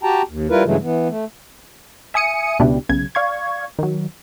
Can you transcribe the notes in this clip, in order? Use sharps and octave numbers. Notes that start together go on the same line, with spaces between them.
F#4 G4 G5 A5 A#5
D#2
G3 E4 F4 A#4 B4
G2 C#3 E3 F#3 G#3 A3
E3 B3
A3
E5 G#5 D#6 C#7 D#7
C#2 B2 D4 E4 G4
B1 C#3 G#6
D5 F5 C#6 G#6
D#3 F#3